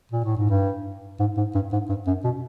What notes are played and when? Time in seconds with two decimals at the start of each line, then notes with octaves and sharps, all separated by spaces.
0.12 A#2
0.25 A2
0.37 G#2
0.50 G2
1.19 G#2
1.37 G#2
1.55 G2
1.72 G#2
1.89 G2
2.07 F#2
2.24 B2